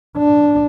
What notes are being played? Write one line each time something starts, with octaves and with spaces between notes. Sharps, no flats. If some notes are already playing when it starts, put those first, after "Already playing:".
D4